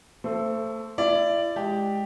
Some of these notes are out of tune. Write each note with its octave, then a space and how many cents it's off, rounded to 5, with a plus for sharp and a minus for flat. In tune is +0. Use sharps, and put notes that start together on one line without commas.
A3 +35 A4 +0 C5 +0
E4 +35 D5 +0
G#3 +5 G4 +0